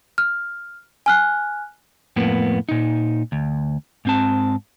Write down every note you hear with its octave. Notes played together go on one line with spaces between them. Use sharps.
F6
G#5 F6 F#6
F2 A2 A#3 B3
A#2 D#4
D2
G#2 C4 A5